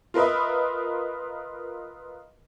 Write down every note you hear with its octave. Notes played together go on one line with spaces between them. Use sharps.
F4 A#4 B4 D#5 E5